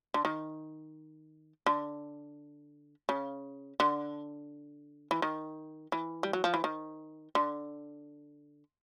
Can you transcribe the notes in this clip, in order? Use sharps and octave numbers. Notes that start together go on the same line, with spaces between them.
D3
D#3
D3
C#3
D3
E3
D#3
E3
G3
F#3
F3
E3
D#3
D3